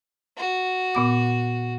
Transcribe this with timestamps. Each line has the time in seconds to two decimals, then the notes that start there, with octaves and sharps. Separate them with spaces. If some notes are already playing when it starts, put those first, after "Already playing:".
0.37 F#4
0.95 A#2 B3 D6